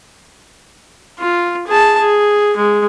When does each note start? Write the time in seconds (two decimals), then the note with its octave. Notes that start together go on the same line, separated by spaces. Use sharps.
1.19 F4
1.67 G#4 A5
2.00 G#4
2.56 G#3